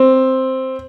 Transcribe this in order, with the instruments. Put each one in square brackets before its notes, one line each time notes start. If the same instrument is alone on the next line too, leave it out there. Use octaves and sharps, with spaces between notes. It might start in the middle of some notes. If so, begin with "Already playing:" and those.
Already playing: [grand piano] C4